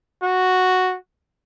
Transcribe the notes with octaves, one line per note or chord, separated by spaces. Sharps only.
F#4